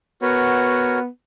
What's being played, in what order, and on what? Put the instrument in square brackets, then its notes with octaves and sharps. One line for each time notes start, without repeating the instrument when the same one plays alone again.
[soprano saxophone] B3 [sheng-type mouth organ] F#4 A#4 C#5